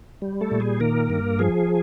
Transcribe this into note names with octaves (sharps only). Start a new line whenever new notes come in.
G3
A3 A4
A#2
G#4
D#3 A#3 A#4
G2
F3 G#4